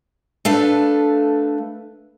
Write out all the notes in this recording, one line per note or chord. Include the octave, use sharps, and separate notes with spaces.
A3 D4 A4 B4 F5